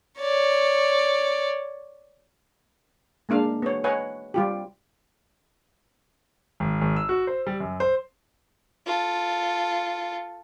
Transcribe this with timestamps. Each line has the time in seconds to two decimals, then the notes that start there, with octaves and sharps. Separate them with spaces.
0.19 C#5 D5
3.29 G#3 A#3 D4 F5
3.62 B3 C#5
3.84 B4 C#5 D#5 F#5 G#5
4.34 G3 F4 G4
6.60 G#1
6.81 G#1
6.96 E6
7.09 F#4
7.27 C5
7.47 G3
7.60 F#2
7.80 C5
8.86 F4 A4